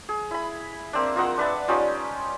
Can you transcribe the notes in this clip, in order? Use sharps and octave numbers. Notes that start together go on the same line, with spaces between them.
G#4
E4 B5
A#3 C4 D4
F4 A#4 D#5 F#5
D4 B4 E5 A5
G3 C#4 D#4 F4